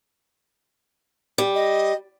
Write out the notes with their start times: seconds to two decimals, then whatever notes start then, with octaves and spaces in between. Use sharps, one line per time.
1.38 G3
1.55 D#5